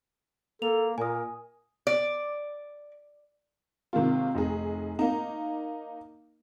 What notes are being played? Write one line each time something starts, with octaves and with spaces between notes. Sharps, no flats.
A#3 A4 F7
A#2 A#4 G#5 D#6
D5
C3 D#3 G#3 A#3 F4
F1 D#4 G#4
A#3 D#4